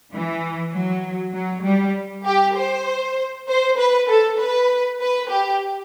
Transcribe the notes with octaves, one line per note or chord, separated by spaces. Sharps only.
E3
F#3
F#3
G3
G4
C5
C5
B4
A4
B4
B4
G4